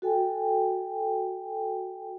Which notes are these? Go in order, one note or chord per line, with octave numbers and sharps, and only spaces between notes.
F#4 A4 G5 G#5